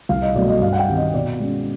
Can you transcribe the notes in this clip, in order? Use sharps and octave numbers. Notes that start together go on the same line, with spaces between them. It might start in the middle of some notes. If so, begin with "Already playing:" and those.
C2 F5
D#5
B2 F#3 A3 D5
D#5
G2 F5
F#5
G5
D#3 G3 C4
D#5
B2 D5
G#3 C#4